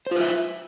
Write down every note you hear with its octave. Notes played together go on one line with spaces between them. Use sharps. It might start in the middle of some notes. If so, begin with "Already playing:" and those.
F4 B4 C5 E5